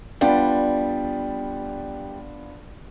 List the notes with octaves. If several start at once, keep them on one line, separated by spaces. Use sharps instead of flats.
G3 B3 D4 F4